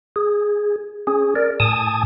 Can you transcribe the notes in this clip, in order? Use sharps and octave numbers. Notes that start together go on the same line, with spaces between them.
G#4
C#4 G#4
A#4 D5
A2 G#5 A5 D#6